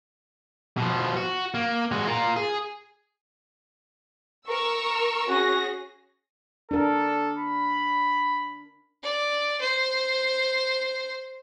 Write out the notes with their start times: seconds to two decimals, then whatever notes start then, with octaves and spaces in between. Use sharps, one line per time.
0.77 B2 F3
1.16 F#4
1.54 A#3
1.92 G#3 F#4
2.07 F4 A#4
2.36 G#4
4.48 A#4 C#6 E6
5.29 C#4 F#4 G#4 A#6
6.71 D4 A4 A#4
7.39 B5
9.03 D5
9.61 C5